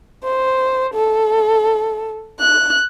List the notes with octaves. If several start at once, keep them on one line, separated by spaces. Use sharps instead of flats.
C5
A4
F#6